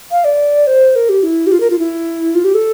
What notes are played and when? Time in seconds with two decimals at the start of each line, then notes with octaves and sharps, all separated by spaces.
0.11 F5
0.25 D5
0.67 C5
0.96 A#4
1.09 G4
1.23 E4
1.47 G4
1.52 F4
1.60 A#4
1.70 F4
1.79 E4
2.35 F4
2.44 G4
2.54 A4